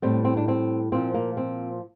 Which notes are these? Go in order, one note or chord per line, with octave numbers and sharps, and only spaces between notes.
A2 G3 C4
C4
D4
C4
A#2 F3 C4
A#3
C4